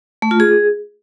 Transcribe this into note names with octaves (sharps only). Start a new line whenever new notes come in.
A3
F4
G#4